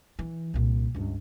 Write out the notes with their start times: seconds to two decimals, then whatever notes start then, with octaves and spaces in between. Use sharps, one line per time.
0.19 E3
0.54 C2 A#2
0.95 C#2 G2